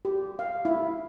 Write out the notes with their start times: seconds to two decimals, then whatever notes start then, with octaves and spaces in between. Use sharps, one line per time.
0.05 G4
0.39 F5
0.65 E4